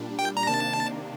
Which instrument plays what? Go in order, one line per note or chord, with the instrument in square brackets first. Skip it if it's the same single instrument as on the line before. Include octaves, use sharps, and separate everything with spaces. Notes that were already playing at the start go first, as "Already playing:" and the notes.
Already playing: [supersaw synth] A#2 G3 D4
[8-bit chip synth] G5
A#5
[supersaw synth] C3 D#3 A#3 D4 [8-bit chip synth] A5